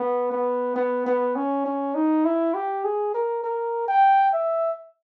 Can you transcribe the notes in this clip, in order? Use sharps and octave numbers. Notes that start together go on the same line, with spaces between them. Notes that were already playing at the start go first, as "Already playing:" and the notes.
Already playing: B3
B3
B3
B3
C#4
C#4
D#4
E4
G4
G#4
A#4
A#4
G5
E5